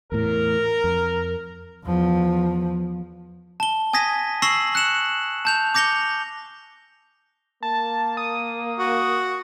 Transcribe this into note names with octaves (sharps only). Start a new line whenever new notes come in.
E2 A2 A#4
F2
E2 F3
A5 G7
G#5 D#6 G#6 A#6 B6 D#7
C#6 E6 A#6 C7 E7 F#7
F#6 C#7 E7 F#7
A5 G6 F7
D6 G6 A#6 C#7 F7 G7
A#3 A5
D#6
F#4